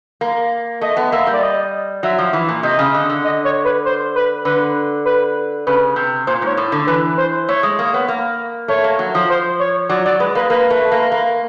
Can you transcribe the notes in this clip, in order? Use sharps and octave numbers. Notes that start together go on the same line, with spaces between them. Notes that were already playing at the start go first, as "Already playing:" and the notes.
A#3
A3 D#5
B3
A#3 E5
G3
D5
D#5
F#3 E5
F3
E3
A#2
C3 D#5
C#3
D3
D3
D#5
C#5
B4
C5
B4
D3 B4
B4
C#3 B4
C3
A#2 C5
G#2 C#5
A2
D3
E3 B4
C5
A3 C#5
G#3
A#3
B3
A#3
A3 C#5
A#3
F#3
F3
C5
C#5
F#3 D5
F#3 D5
G#3 B4
A#3 B4
A#3 B4
A3
A#3
A#3